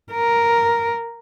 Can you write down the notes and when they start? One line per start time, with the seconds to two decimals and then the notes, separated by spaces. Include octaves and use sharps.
0.13 A#4